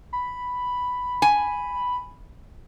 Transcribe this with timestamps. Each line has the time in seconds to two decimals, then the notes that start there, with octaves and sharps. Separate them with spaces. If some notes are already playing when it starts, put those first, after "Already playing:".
0.13 B5
1.22 G#5